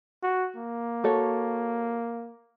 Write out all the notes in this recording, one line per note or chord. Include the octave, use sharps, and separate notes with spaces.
F#4
A#3
F#4 A4 C#5